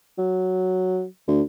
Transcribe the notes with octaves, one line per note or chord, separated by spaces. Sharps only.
F#3
D2